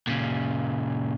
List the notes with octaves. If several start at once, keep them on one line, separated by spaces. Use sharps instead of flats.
A#2 C#3